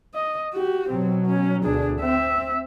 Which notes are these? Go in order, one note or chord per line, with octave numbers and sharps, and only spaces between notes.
D#5
F#4 G4
B2 F#3 C4
C#4
D2 B2 D4 G#4
C4 E5